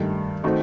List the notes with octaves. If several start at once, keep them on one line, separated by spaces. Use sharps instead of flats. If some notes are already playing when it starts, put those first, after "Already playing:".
Already playing: G2 D#3 A3
D#3 A3 C4 D#4 F#4